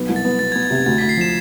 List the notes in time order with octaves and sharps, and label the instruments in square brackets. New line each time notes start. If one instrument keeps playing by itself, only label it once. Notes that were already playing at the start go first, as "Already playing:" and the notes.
Already playing: [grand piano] B1 B3
C2
[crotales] A6
[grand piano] B3
[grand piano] B3 [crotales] A6
[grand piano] B3 [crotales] G#6
[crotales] A6
[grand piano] C3 [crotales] G#6
[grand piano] D2 [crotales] A6
[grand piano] D2 [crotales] B6
[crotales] C7
[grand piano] F3 [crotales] E7